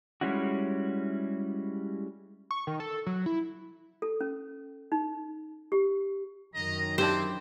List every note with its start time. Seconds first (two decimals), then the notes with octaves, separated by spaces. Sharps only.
0.21 G3 G#3 C#4 E4 F#4
2.51 C#6
2.67 D#3
2.80 A4
3.06 F#3
3.26 E4
4.02 A4
4.21 C#4
4.92 D#4
5.72 G4
6.55 F#2 D#3 D#5 A#5
6.98 C4 D4 E4 G4 C5